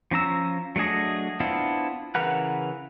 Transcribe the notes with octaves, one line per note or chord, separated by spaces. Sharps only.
F3 C#4 A#5 E6
F#3 A3 D4 G#4 D#5
B3 C4 D4 E4 F4
C#3 E3 A#4 B4 F#5